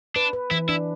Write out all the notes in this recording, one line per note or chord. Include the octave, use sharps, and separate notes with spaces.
D4 B4
B4
E3 E4
D4 E4